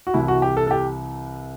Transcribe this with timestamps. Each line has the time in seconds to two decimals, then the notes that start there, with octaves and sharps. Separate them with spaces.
0.07 F#4
0.14 C2 C3 E3 E4
0.28 F#4
0.42 G4
0.57 A4
0.67 A4
0.71 G4